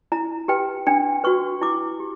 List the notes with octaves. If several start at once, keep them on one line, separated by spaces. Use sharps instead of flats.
E4 A#5
G4 B4 G5
D4 G5
F#4 B4 C#6
E4 D6
G4